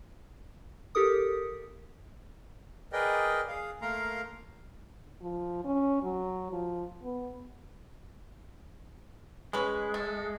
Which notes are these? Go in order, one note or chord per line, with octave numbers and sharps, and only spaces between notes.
G4 A4 A#4 D#6
G#4 A#4 B4 D5 D#5 G5
G#4 F5
A3 A#3 A#4 F5 A#5 C6
F3
C#4
F#3
F3
B3
G#3 C#4 B4
A3